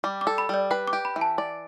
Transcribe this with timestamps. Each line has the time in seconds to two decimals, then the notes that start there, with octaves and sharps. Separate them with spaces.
0.04 G3 D6
0.21 D6
0.27 A4
0.38 B5
0.49 G3 D5
0.71 B4 G5
0.88 D6
0.93 G4
1.05 B5
1.16 E3
1.21 A5
1.38 D5